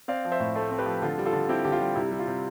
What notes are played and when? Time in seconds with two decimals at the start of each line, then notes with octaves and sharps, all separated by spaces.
0.08 C4 D5 F5
0.25 F3
0.32 C5 E5
0.40 A2
0.55 A3 A4 C5
0.71 C4
0.79 G4 B4
0.86 F3
1.02 D3 F4 A4
1.18 G3
1.26 F4 A4
1.33 D3
1.49 C4 E4 G4
1.65 D3 G4
1.72 F4
1.80 G3
1.96 C3 E4
2.12 G3
2.19 F4
2.27 C3